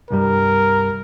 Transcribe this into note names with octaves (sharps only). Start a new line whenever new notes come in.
C2 G2 G3 A#4